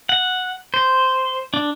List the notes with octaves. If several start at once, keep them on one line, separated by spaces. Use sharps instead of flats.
F#5
C5
D4